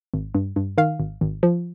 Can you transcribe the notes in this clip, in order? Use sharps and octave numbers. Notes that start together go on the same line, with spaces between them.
G#1
G2
G2
D#3 F5
G#1
G#1
F3